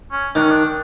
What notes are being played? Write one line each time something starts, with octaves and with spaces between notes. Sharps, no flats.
C#4
D#3 D4
C#4
D4